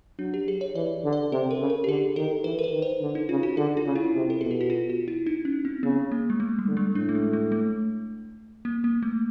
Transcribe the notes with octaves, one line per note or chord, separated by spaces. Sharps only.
F#3 D4
G4
G#4
C#5
E3 D5
D3
D5
C3 A4
A#4
C#3
A#4
G4
D3 G#4
D#3 A4
E3 B4
A#4
B4
D#3
C5
D3
D#4
C#3 F4
F#4
D3 G#4
F4
C#3
E4
C3
A4
B2 G#4
G4
F#4
F4
F#4
E4
D#4
C#4
C4
C#3 B3
A#3
G#3
A3
G3
D3
G#3
A2 D4
A3
G#3
A3
A3
A#3
A#3
A3